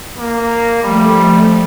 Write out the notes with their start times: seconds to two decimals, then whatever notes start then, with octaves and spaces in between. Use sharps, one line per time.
0.17 A#3
0.83 F3 G3 A3